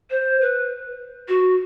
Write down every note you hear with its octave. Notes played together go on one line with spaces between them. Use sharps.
C5
B4
F#4